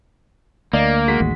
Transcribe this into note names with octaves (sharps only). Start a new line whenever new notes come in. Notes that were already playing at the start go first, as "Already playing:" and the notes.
D2 A#3 D5 D#5
G#3 F#4 B6
A1 D#2